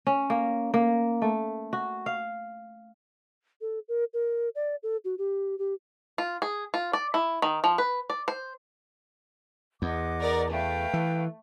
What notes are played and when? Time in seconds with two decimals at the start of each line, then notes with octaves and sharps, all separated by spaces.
0.07 C#4
0.30 A#3
0.74 A#3
1.22 A3
1.73 F#4
2.06 F5
3.61 A4
3.88 A#4
4.13 A#4
4.55 D5
4.83 A4
5.04 F#4
5.18 G4
5.58 G4
6.18 F4
6.42 G#4
6.74 F4
6.93 D5
7.14 E4
7.42 D#3
7.64 F3
7.78 B4
8.10 D5
8.28 C5
9.82 E2 D#5 F#5 D6
10.21 A#4 D5
10.51 A3 B4 F5 G5
10.93 E3